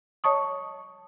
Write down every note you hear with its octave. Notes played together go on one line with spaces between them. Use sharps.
C#5 D#5 A5 C#6 D#6